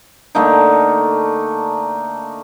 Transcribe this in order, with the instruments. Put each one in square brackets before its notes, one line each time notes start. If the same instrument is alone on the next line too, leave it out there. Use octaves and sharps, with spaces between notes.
[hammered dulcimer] D3 A3 A#3 D#4